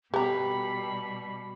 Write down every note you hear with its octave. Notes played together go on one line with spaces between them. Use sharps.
B2 G3 B3 G4 A#5 B5